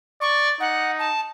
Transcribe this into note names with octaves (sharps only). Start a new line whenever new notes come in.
D5 C#6
D#4 F#5
A5